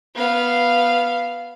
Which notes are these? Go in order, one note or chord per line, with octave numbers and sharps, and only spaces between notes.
B3 F5